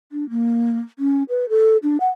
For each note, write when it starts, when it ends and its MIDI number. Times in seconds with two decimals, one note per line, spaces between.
0.12 0.28 62
0.30 0.78 58
0.99 1.23 61
1.29 1.49 71
1.49 1.77 69
1.83 1.97 62
2.00 2.09 78